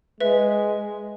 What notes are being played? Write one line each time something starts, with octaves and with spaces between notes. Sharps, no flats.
G#3 B4 E5